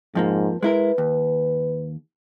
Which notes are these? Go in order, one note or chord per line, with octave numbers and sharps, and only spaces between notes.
F2 G#2 F3 A#3
G#3 E4 A#4 B4
D#2